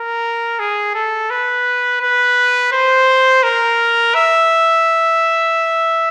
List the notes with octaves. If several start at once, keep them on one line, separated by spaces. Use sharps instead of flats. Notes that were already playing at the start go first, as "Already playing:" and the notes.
Already playing: A#4
G#4
A4
B4
B4
C5
A#4
E5